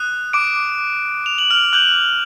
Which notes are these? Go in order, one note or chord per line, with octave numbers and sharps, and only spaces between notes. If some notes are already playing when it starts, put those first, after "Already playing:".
Already playing: D#6 F#6
D6 D7
F7
F#7
F6 F7
D6 F#6 G6 F#7